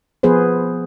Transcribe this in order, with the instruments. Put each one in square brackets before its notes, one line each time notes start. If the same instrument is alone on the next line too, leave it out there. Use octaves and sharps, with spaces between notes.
[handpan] F3 B3 G#4 B4 C5